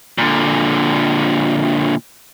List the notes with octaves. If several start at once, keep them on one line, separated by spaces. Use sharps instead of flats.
A#2 D3